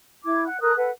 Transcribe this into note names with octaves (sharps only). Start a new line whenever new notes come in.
E4 D6 G#6
F#5 F#6
A4 A#4 D#6 F#6
A4 B4 F#5